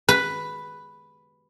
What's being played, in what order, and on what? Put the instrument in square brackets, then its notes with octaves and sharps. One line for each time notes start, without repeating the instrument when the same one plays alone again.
[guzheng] B4